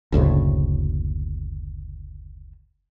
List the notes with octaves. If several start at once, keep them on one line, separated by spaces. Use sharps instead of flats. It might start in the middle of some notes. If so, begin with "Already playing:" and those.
F#1 D2 A2 C#3